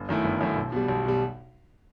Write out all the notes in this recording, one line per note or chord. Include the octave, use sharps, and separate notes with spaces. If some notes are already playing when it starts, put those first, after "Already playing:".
Already playing: G1
F#2 D#3 A3 E4
G1
F#2 D#3 A3 E4
B1
B2 G3
B1
B2 G3